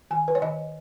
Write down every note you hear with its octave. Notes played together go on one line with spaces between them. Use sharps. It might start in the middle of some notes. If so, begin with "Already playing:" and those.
D#3 G#5
B4
C#5
D#3 D#5